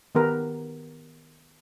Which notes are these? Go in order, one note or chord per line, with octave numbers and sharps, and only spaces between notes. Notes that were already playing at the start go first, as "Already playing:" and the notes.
D#3 B3 G4 A#4 B4